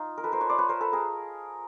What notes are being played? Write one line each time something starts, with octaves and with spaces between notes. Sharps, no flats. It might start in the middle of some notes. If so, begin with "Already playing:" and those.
Already playing: D#4 F4
A#4
A4 B4
A#4 C5
B4 C#5
C5 D5
B4 C#5
A#4 C5
A4 B4
G#4 A#4